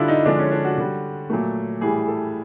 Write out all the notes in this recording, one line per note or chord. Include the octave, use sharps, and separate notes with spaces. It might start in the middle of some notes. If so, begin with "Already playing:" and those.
Already playing: D3 G3 D4 E4 F4
D#4
D3 F3 G#3 D4
C#4
D4
F#4
D3 G3
A#2 F#3 A3
A2 E3 G3 G#4
A4